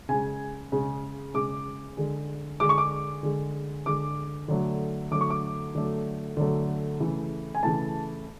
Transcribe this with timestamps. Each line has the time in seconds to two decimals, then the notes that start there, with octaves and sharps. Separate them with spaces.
0.09 C#3 G#3 G#5
0.72 C#3 G#3
1.34 C#3 G#3 D6
1.97 D3 G#3
2.60 D3 G#3 D6
2.69 C#6
2.78 D6
3.23 D3 G#3
3.86 D3 G#3 D6
4.48 D3 F#3 A3
5.11 D3 F#3 A3 D6
5.21 C#6
5.30 D6
5.75 D3 F#3 A3
6.37 D3 F#3 A3
7.00 C#3 E3 A3
7.55 G#5
7.63 C#3 E3 A3 A5